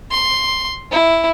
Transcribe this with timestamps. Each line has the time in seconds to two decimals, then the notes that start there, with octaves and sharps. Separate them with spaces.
0.11 C6
0.91 E4